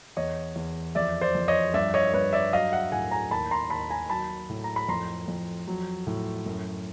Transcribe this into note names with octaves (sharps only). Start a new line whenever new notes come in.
E2 C#5 D#5
E2
F2 D5 E5
C5 D5
F2
C#5 D#5
G2 D5 E5
C#5 D#5
G2 B4 C#5
D5 E5
F#3 D#5 F5
E5 F#5
A2 F#5 G#5
G#5 A#5
D#2 A5 B5
A#5 C6
D#2 A5 B5
G#5 A#5
F#3 A5 B5
A2
A#5
B5
F2 A#5 C6
F2
F#3
A2
F#2